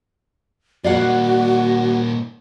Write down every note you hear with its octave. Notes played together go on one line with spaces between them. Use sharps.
A#2 G3 F#4 D5 F5 F#5